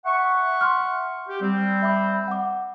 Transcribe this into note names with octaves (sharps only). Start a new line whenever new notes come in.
E5 F#5 C#6
C6 F6
G4
G3 C4
E5 B5 D6
F#5 D6